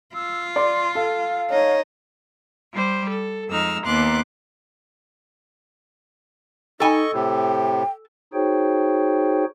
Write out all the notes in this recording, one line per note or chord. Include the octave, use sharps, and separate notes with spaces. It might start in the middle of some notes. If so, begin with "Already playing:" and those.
F4 E6
D5 C6
A4 F5
D#4 C#5
G3 C5
A4
F2 G#3 D#4 E6 F6
D#2 B3 C6 D6 F#6
D#4 A4 D#5 G#5 C#6
A2 C3 G5
D#4 F#4 G#4 C5 C#5 G5